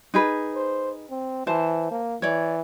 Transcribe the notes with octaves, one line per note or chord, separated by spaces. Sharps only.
D#4 G#4 B4
C5
C4
E3 C5 A5
A#3
E3 C#5 D5